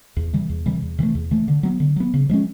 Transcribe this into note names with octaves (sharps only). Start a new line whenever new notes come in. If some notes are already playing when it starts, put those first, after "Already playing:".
E2
C3 E3 G3
E2
C3 E3 G3
E2
C3 E3 A3
E2
C3 E3 A3
D3
F#3 B3
D3
F#3 B3
C#3
F3 G#3 C#4